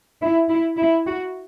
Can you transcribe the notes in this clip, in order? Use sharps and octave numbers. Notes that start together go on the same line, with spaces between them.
E4
E4
E4
F#4